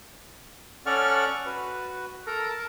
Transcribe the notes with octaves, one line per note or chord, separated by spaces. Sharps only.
C#4 A4 D5 F#5 C#6 F6
F#4 B4
A4 A#4 A#5
A#4 A5